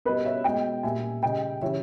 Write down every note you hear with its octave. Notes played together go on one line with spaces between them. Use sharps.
B2 G3 B4 D#5
C#5 E5
B2 G#3 D#5 G5
A#2 G3 E5 G#5
C#3 G3 D#5 G5
C#3 E3 G3 C#5 E5